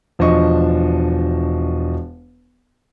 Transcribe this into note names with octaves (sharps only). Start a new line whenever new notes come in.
E1 F3 D4 D#5 C#6